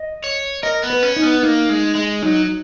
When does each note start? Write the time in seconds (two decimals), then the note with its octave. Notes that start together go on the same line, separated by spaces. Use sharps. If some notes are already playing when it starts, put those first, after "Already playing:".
Already playing: D#5
0.24 C#5
0.63 A#4 D#5
0.83 B3
0.90 B4
1.03 C#4
1.16 D#4
1.23 B3
1.43 A#3 D#4
1.69 G#3
1.95 G#3
2.22 F#3 D#4